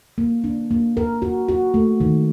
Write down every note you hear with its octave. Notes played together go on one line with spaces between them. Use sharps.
A#3
D4
A#3
A#4
F#4
F#4
A3
D#3